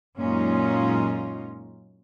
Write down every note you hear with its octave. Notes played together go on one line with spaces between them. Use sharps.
F#2 A#2 G#3 C#4 D#4 F4